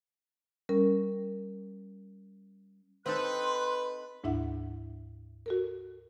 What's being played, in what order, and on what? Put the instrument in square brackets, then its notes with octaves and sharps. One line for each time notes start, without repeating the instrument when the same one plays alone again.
[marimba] G3 C#4 A#4
[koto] C4 D#4 A4 [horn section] B4 [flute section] C6 F#6
[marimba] D2 G#2 D4 E4 E5 F#5
F#4 A4 A#4